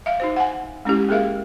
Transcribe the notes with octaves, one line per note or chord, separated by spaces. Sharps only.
E5 F5
D#4 F#4 C5
F#5 G#5
G#3 C#4 E4 G4
A#3 G#4 A#4 E5 F5